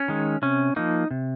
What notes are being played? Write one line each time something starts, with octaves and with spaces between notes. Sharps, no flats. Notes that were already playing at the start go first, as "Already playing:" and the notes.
Already playing: C#4
D#3 G#3
C3 C#4
F3 A#3 D#4
C3